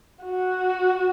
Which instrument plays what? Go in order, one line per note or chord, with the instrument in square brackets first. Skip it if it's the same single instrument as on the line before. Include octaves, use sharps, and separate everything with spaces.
[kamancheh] F#4